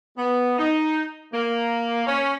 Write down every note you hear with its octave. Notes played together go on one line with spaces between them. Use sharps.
B3
D#4
A#3
C#4